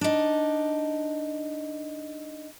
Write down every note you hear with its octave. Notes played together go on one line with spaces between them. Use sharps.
D4 D#4